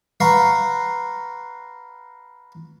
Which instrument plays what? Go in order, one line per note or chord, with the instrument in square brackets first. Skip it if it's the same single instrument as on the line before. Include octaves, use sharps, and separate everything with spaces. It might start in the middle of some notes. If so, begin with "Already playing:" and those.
[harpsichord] B4 F5 F#5 A#5 C6 C#6